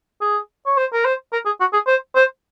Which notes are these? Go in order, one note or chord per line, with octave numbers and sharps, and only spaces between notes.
G#4
C#5
C5
A#4
C5
A#4
G#4
F#4
G#4
C5
C5